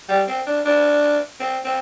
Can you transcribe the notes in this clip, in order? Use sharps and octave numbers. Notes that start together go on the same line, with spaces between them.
G3
C4
D4
D4
C4
C4